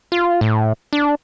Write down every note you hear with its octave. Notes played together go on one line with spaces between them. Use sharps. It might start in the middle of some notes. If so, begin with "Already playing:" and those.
F4
A2
D4